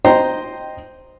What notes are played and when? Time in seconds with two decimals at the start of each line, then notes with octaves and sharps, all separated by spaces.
0.05 C5 D#5 G5 A#5 C6